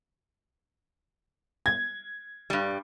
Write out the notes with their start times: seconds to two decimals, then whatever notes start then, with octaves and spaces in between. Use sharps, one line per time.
1.66 G#6
2.50 G2 G3